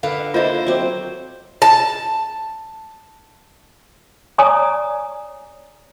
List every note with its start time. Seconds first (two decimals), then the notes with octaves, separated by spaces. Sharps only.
0.03 D3 A#4 B4 F5
0.34 A#3 E4 F4 C5 D#5
0.66 F#3 C4 G4
1.62 A5
4.38 C#5 D5 G#5 A#5 D#6